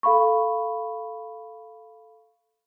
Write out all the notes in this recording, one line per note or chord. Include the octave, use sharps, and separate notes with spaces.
A4 F5 B5 C#6